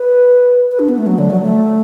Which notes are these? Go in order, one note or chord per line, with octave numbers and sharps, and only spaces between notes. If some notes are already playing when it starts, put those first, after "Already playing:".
Already playing: B4
B4
D4
B3
A3
F#3
D3
F#3
A3